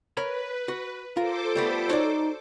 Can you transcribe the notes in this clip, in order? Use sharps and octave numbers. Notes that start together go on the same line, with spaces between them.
A#4 B4 C#5 B5
F#4
F4 A4 A#4 C5 D6
G3 A3 B3
D#4 F#4 C#5 D5